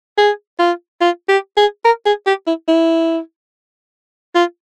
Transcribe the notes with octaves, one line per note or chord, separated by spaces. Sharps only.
G#4
F4
F4
G4
G#4
A#4
G#4
G4
E4
E4
F4